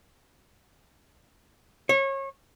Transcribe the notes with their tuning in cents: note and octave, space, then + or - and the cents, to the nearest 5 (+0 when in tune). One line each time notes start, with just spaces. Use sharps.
C#5 -30